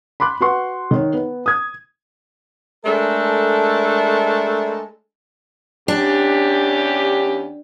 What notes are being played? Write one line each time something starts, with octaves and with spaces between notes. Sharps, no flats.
B5 C6 D6 F#6
F#4 B4 F#5 C6 C#6
D#3 C#5
B3
D#6 G#6
G#3 A3 D4 A4 A#4
E2 C#4 D4 G4